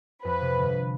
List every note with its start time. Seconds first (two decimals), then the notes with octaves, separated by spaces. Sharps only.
0.25 F2 B4
0.41 C3
0.57 G1